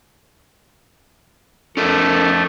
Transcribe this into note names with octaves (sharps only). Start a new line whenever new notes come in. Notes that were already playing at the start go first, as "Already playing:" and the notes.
F2 A3 C#4 A4 A#4